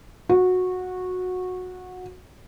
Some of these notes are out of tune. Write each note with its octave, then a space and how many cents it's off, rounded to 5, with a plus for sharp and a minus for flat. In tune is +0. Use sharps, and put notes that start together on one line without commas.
F#4 -15